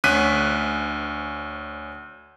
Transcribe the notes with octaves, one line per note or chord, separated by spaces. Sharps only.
D2 C#4 F#6 B6 D#7